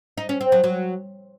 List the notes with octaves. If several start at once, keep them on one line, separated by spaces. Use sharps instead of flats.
D#4
C#4
C4
F#3
F#3